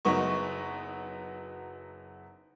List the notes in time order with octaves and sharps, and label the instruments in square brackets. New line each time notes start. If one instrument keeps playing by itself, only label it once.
[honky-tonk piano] F#1 F#3 B3 D#4 C#6